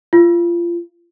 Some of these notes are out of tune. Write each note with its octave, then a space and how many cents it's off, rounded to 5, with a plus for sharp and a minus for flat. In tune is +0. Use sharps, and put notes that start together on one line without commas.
F4 -25